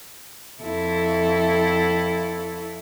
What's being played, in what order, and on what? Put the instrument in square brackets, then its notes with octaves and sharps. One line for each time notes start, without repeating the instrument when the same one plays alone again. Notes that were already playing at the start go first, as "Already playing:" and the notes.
[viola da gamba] F2 E4 A4